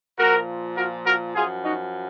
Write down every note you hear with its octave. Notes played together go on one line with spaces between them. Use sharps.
A#2 F3 F#4 A#4
F#4 A#4
F#4 A#4
F#2 F3 F4 G#4
D#4 F#4